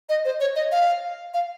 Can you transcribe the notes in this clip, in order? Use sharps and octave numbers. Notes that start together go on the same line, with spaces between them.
D#5
C5
C#5
D#5
F5
F5